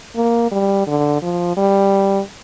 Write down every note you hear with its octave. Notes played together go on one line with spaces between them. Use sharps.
A#3
G3
D3
F3
G3